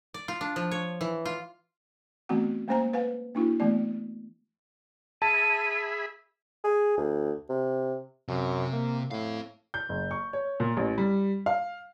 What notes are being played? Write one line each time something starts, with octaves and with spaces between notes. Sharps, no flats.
D5
F4
D4
F3
C#5
E3
F4
E3 A3 B3 C4 F#4 F#5
G#3 A#3 C#4 C5 G#5 A#5
B4 F5 F#5 G#5
A#3 D4 E4 F#4
E3 A3 B3 D5
G#4 E5 A5 B5 D#7
G#4
D2
C3
F#2 C3
A#3
A2 C4 F5
G6
F#1
C#6
C#5
A#2
A1
G3
F5